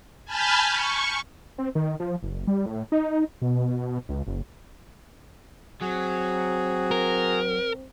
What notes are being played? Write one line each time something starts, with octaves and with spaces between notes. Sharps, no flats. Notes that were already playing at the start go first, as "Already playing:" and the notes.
G#5 A5 B5 F6 G6 A6
C#6
C4
D#3
F3
F#1
G3
A2
D#4
B2
C#2
F#1
F#3 C4 F#4 G#4
A#4